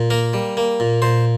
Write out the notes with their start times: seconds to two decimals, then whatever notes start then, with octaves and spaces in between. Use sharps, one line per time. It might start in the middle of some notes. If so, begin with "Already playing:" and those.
Already playing: A#2
0.10 A#3 A#4
0.33 G3
0.57 A#3
0.80 A#2
1.02 A#2 C5